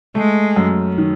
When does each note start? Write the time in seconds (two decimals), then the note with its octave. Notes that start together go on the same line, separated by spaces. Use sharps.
0.15 G#3 A3
0.56 F#2
0.98 D#3